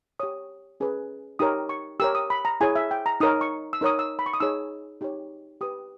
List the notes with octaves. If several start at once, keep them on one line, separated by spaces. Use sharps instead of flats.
G4 C#5 D#6
C#4 G#4 B4
D#4 G4 A#4 C#5 D#6
C#6
G4 A#4 C#5 E6
D#6
B5
A#5
E4 G#4 C#5 G#5
E5
G5
A#5
D#4 A#4 C#5 D#6
C#6
E6
D#4 A#4 C#5 D#6
E6
B5
C#6
D#6
D#4 G#4 C#5 E6
D#4 G4 C#5
G4 B4 D#6